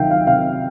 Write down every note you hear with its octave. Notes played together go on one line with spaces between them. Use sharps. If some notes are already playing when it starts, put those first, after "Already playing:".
Already playing: C3 D#3 F#3 E5 F5 G5
F5
C3 F5